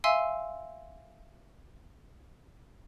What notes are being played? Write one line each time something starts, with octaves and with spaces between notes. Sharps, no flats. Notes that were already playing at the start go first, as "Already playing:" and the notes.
E5 F5 G#5 C6 E6